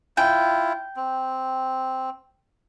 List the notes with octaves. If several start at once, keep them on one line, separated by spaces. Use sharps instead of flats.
E4 F4 G5
C4